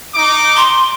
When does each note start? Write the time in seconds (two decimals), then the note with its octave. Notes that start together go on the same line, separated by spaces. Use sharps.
0.15 D#4 D6
0.57 C6